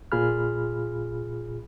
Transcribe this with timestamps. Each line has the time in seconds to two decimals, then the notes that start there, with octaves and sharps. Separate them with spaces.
0.12 A#2 F4 G#4 B5 F6